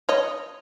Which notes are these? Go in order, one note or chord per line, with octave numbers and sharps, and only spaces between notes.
C#5 D#5